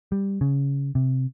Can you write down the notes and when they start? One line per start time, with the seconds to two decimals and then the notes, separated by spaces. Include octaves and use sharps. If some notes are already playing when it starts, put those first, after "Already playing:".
0.12 G3
0.41 C#3
0.95 C3